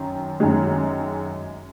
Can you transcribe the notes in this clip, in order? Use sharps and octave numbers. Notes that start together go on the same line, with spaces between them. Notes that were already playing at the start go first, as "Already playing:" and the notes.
Already playing: F#2 D#3
F#2 D#3 G#3